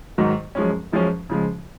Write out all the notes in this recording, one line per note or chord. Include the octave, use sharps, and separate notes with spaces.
G#2 D#3 F#3
F#2 F3 G#3 C#4
F#2 F3 G#3 C#4
C#3 F3 G#3